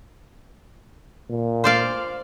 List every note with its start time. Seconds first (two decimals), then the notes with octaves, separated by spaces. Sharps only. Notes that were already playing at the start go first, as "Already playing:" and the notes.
1.30 A#2
1.64 C5 D5 F5